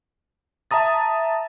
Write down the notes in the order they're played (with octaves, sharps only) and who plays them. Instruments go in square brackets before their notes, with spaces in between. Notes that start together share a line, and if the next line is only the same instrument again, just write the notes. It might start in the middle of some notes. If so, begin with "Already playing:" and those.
[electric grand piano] E5 A5 A#5 D#6 A6